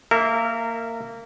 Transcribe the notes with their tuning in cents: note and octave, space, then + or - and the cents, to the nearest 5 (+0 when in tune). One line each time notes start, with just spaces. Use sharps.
A#3 -20 A#4 -25 E5 +0